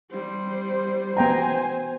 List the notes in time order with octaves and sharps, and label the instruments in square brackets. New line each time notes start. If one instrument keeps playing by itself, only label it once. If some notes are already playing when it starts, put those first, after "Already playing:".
[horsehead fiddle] G3 C5
[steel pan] B3 G5 A#5 [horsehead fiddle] C5 G#5